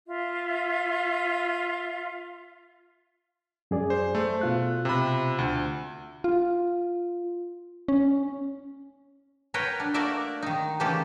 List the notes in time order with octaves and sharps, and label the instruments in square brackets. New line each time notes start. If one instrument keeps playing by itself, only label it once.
[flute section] F4 E5
[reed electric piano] F#2 G#4 D5
[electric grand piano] C5
[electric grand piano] A3 [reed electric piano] C5
[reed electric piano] B2 F4 F#6
[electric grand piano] C3 B5
D2
[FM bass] F4
C#4
[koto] A#4 B4 C#5 F#5 G5
D4
A3 A#3 F#4 A#4 D5 E5
D#3 D#4
C#3 E3 A3 A#3 G4 A4